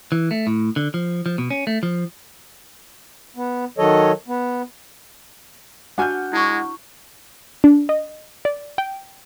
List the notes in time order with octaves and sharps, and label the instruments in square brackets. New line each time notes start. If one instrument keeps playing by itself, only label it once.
[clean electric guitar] E3
A3
A2
D3
F3
F3
B2
C#4
A3
F3
[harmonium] B3
D#3 F#3 A4 C#5 D#5
B3
[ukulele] D4 F#4 G#5 [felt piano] F#5 F6 G6
[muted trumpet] G#3 [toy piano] E4 C#6
[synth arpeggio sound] D4
D#5
D5
G5